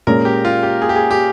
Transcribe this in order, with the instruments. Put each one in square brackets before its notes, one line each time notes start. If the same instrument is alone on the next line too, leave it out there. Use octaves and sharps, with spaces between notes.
[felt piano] A#2 G#3 C#4 [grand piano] A#4
[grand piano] G4
F4
G4
G#4
G4
G#4
G4